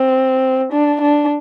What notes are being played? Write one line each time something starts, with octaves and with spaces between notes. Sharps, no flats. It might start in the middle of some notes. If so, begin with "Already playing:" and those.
Already playing: C4
D4
D4